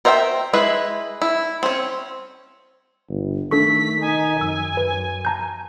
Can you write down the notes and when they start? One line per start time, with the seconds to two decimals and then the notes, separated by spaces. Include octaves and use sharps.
0.05 A#4 C5 E5 F#5 G5
0.53 G#3 E4 B4
1.22 E4
1.63 C4 C#4
3.08 G1
3.51 D#3 A3 D4 A4 C#6 B6
4.01 D#4 G#5
4.41 F#2 E6
4.77 B4
5.25 A5 A#5 G6